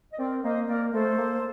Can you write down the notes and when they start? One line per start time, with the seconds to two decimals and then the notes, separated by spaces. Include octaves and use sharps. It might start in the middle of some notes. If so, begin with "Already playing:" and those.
0.13 D#5
0.18 C4 A#4 D5
0.43 A#3 C5 D#5
0.68 A#3 A#4 D5
0.93 A3 A4 C5
1.09 A3
1.18 A#3